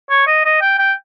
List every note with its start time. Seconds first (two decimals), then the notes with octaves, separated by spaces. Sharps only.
0.10 C#5
0.27 D#5
0.45 D#5
0.62 G5
0.79 G5